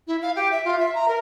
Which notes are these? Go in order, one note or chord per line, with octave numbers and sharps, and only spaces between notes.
E4
F5
G4
E5
F4
E5
A#5
A#4